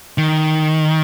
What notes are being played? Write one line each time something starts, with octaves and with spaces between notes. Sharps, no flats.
D#3